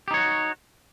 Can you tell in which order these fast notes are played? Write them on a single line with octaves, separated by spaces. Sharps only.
G4 D#4 C#5 F#4